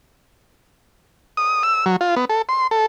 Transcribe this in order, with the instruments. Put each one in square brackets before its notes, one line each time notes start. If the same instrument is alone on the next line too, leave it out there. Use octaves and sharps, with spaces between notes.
[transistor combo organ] D#6
E6
F#3
F4
B3
A4
C6
A4